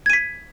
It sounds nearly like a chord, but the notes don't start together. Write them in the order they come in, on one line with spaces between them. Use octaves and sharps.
G#6 D#7 B6